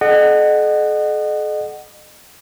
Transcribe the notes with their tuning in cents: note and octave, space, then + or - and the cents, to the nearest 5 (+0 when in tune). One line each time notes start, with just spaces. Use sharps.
A4 -45 D#5 -35 F#5 +10